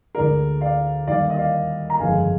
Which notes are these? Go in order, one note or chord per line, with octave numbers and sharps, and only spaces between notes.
D2 D3 G#3 A#4 D5
D5 F5
D#2 D#3 G3 D5 F5
D#5
D5 F5
A#5
G1 F2 D#3 G#3 F5 G#5